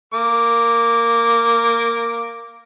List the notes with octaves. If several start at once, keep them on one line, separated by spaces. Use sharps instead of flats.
A#3 D6